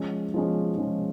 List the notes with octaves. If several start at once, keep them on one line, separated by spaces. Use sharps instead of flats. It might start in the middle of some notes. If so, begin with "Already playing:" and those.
Already playing: F3 G#3 C#4
F3 G#3 C#4
F3 G#3 C#4